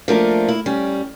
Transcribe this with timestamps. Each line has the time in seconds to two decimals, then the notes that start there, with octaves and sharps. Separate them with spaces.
0.08 F3 A3 A#3 D4 F4 A#4
0.49 E4
0.66 G3 C#4